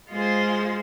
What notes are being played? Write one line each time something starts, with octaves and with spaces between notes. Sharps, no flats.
G#3 F4 G#4 C5